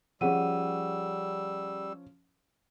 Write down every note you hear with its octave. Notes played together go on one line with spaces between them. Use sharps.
F3 G3 C#4 G#4 F#5 E6 D#7